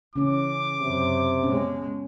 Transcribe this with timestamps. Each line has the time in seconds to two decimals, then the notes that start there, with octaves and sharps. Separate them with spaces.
0.16 C#3 E3 C#4 D6
0.81 F#2 C3
1.43 B2 G#3 C#4